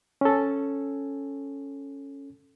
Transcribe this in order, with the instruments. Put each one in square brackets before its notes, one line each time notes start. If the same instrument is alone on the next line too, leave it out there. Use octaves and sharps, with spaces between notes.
[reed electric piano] C#4 A4